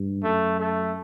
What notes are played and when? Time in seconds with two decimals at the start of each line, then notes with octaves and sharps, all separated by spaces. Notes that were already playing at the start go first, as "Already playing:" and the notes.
Already playing: G2
0.23 F#2 A3
0.60 A3